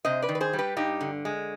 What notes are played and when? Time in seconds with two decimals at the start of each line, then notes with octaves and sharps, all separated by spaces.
0.05 C3 C5 D#5
0.22 B4 D5
0.29 D#3
0.35 B4
0.41 G#4 C5
0.53 G3
0.58 G4 B4
0.77 G2 D#4 G4
1.01 D3
1.25 G#3